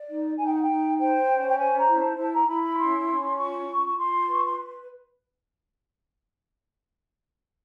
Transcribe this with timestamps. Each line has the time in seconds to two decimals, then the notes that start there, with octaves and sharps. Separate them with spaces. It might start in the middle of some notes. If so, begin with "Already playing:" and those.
Already playing: D5
0.09 D#4
0.39 D#4 G#5
0.46 G5
0.54 F#5
0.61 G5
0.68 D#4
0.98 C5 G5
1.28 C#4
1.48 G5
1.58 C5 G#5
1.78 A#5
1.88 E4
1.98 A5
2.18 E4 A5
2.33 A#5
2.48 E4 B5
2.63 B5
2.78 C#4 C6
3.07 C#4
3.37 F4 C#6
3.67 F4
3.87 C#6
3.97 F4 C6
4.27 B4
4.33 C#6
4.45 C6